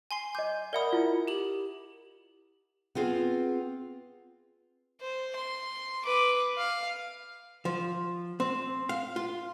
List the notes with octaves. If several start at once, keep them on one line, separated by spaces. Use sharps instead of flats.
G#5 C6 C7
D#5 D6 G6
A#4 D5 E5 F#5 B5 D#6
E4 F4
G4 F#7
B3 C4 F4 G#4
C5
C6
B4 D6
F5
F3
C4
F5
F4